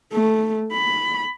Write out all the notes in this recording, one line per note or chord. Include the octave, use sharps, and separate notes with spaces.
A3
B5